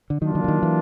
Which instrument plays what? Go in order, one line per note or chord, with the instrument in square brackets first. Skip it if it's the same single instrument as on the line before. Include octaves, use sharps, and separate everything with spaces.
[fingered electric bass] D3
[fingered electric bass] D#3 [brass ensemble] F#3 A#3 D4 F4
[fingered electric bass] D#3
D3
D#3
E3